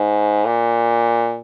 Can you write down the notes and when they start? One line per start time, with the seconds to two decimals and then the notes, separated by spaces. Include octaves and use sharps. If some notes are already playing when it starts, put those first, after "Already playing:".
Already playing: G#2
0.45 A#2